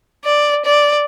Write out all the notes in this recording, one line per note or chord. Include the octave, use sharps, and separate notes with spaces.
D5
D5